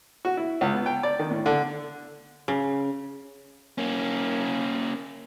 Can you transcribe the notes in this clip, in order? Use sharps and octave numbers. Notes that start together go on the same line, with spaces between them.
F#4
E4
C#2
B3
G5
D5
D#3
A2
D3
C#3
A#3 C#4